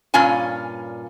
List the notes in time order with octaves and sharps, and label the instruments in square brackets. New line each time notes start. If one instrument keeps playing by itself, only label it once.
[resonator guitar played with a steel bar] G2 A#2 C#4 F4 G#5